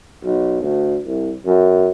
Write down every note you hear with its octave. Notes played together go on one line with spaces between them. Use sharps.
B1
D2
C2
F#2